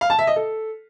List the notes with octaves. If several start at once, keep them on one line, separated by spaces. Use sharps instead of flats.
F5
A5
E5
D#5
A4